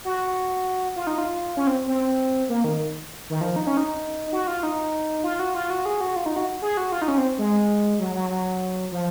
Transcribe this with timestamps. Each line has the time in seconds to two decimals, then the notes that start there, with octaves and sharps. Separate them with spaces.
0.05 F#4
0.96 F4
1.07 D#4
1.18 F4
1.57 C#4
1.67 C4
1.88 C4
2.49 A#3
2.64 D#3
3.30 D#3
3.41 F3
3.56 D#4
3.67 C#4
3.77 D#4
4.33 F#4
4.47 F4
4.63 D#4
5.24 F4
5.39 F#4
5.55 F4
5.70 F#4
5.86 G#4
6.01 F#4
6.16 F4
6.26 D#4
6.36 F#4
6.62 G#4
6.77 F#4
6.92 F4
7.02 D#4
7.08 C#4
7.18 C4
7.38 G#3
7.99 F#3
8.15 F#3
8.30 F#3
8.92 F3